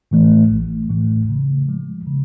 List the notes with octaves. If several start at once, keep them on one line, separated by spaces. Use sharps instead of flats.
A2 E3 A3
A1
A2 E3 A3
C#3
F3 G#3
C#3